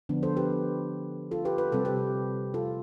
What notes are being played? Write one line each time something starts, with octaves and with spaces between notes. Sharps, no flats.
D3 F3 B3 D4
A4 C5
G4 B4
F4 A4
G4 B4
B4
C3 G3 C4 A4
G4 B4
F4 A4